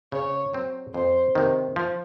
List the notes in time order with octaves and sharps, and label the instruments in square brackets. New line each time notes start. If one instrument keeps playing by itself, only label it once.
[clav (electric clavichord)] C#3 [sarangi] C#5
[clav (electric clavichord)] F#3 C4
[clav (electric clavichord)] F2 [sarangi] C5
[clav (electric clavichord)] C3 D#3
F3